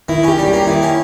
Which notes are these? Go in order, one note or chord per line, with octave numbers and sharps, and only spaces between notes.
D#3 E4
C#4 G4
G3
G4
A#3
D#3 E4
C#4